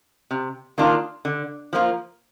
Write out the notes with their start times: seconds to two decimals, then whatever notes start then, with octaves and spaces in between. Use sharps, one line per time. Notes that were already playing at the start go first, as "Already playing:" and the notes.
0.31 C3
0.78 D#3 A#3 D4 F4
1.25 D3
1.73 F3 A#3 F4